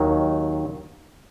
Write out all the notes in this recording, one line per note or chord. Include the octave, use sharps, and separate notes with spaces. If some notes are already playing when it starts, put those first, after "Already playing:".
Already playing: D#2 D#3 F#3